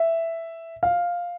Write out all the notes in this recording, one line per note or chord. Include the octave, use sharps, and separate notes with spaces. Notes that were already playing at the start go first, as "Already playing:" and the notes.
Already playing: E5
F5